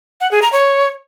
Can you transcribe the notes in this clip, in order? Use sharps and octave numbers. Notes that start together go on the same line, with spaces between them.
F#5
G#4
A#5
C#5